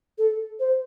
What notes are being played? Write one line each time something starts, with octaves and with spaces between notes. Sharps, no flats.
A4
C5